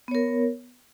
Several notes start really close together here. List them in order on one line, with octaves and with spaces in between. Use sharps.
B3 C#5 A#4